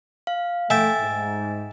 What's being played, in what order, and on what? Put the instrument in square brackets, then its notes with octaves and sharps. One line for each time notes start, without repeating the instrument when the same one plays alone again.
[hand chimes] F5
[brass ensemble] A3 [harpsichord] E5 G5 [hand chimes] G#5 A6
[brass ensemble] G#2